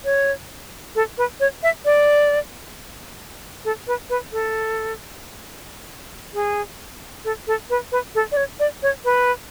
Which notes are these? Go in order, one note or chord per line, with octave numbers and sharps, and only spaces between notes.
C#5
A4
B4
C#5
E5
D5
A4
B4
B4
A4
G#4
A4
A4
B4
B4
A4
D5
C#5
D5
C#5
B4